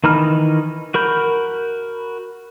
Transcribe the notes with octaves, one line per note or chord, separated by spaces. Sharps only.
D#3 E3 D#4 B5 F6
F#4 A#4 B5 G6